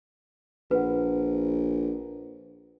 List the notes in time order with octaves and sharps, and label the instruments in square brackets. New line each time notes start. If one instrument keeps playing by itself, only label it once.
[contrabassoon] A#1 [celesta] B4 F#5